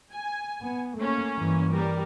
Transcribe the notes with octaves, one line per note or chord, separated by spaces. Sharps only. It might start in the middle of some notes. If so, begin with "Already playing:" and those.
G#5
B3
A3 A#3 C#4
G2 E3
G3 A#4